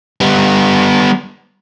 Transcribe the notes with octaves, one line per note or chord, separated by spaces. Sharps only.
G3 B3